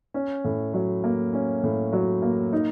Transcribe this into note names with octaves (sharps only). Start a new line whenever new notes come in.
C#4
A2
F#3
A#3
C#4
A2
F#3
A#3
D#4